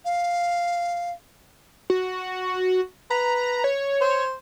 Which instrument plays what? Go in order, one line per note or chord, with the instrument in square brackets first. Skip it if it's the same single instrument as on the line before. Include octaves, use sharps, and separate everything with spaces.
[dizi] F5
[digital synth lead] F#4
[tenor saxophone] B4 [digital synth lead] A#5
[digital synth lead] C#5
[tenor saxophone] C5